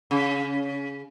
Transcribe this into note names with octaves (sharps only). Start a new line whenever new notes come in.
C#3